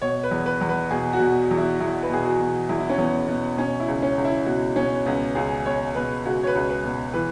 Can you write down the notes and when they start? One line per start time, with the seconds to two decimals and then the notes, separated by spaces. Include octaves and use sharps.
0.02 B2 C#5
0.23 B4
0.31 E2
0.46 B4
0.61 E2
0.69 B4
0.91 B2 G#4
1.13 F#4
1.20 B2
1.51 E2
1.57 E4
1.80 E2 E4
2.03 B4
2.10 B2 G#4
2.24 F#4
2.39 B2
2.69 E2 E4
2.80 E4
2.90 C#4
2.98 E2 B3
3.28 B2 B3
3.57 B2 C#4
3.80 E4
3.88 C#2
4.02 C#4
4.18 C#2
4.25 E4
4.46 B2 F#4
4.76 B2 C#4
5.06 C#2 B3
5.35 C#2 G#4
5.65 B2 C#5
5.95 B2 B4
6.25 C#2 F#4
6.43 C#5
6.47 B4
6.55 C#2
6.69 B4
6.84 B2
7.14 E3 B4